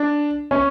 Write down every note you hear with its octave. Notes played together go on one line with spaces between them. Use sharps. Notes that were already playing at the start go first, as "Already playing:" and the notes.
Already playing: D4
C#4